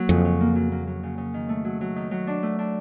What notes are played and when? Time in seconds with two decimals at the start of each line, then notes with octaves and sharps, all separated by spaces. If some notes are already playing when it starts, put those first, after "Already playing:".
Already playing: F#3 A#3
0.09 F2 C#3
0.25 C#3
0.41 A#3
0.56 F#3
0.72 A#3
0.87 F#3
1.03 C#3
1.18 C#3
1.34 D#3
1.49 A3
1.65 F#3
1.81 F#3
1.96 D#3
2.11 F#3
2.27 D4
2.43 A3
2.59 D4